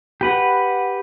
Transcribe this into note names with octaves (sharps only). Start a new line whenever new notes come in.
G4 B4 F#5